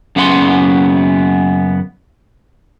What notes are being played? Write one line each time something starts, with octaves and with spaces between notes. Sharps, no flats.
F#2 C#3 B3 F#5 B5 C6